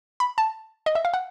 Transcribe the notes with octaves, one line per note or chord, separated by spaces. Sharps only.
B5
A5
D#5
E5
F5
F#5